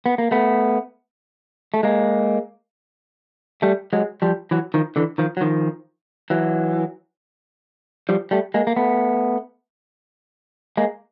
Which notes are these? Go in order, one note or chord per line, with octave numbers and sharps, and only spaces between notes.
B3
A#3
A3 B3
A3
G#3 A#3
G3 A3
F#3 G#3
F3 G3
E3 F#3
D#3 F3
D3 E3
D#3 F3
F#3
D#3 F3
E3 F#3
F3 G3
G3 A3
G#3 A#3
A#3
A3 B3
G#3 A#3